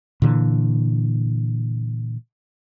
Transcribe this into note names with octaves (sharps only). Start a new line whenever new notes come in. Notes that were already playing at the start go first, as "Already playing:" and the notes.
A#2 D3 E3